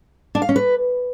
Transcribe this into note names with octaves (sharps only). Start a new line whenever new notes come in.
D4
F5
C#4
B4